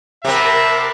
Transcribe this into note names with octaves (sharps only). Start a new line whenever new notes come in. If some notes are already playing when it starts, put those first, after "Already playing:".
C3 C4 A#4 E5 F#5 A5 B5